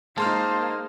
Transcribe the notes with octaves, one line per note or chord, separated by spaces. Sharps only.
G#3 A#3 D#4 C5 A5 C6 F6